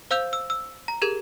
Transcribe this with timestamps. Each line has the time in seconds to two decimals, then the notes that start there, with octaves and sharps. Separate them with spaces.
0.11 C5 F5 E6 G6 F7
0.33 E6
0.50 E6
0.88 A#5
1.02 G4 G#4 A#4 G#6